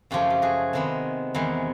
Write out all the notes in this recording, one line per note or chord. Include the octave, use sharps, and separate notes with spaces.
F#2 C#3 F3 A3 F4 G4
G4
F#4 G#4
C3 D#3 G#3 B3
E2 C3 D#3 G#3